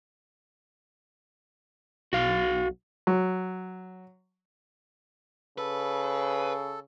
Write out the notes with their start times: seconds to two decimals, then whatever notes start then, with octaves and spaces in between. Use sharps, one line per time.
2.13 B1 F#4 F5
3.07 F#3
5.58 C#3 A4 B4